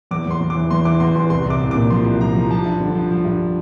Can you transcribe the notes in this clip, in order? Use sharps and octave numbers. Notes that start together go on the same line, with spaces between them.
E2 D6
E2 C6
E2
D6
E3
E2 C6
E3 D6
E2 C6
E3 C6
C2 C6
C2 D6
C2
A#2 D6
F3 C6
C2
F3 A#5
F3
F3 A5
G2
D3
F3
F3
G2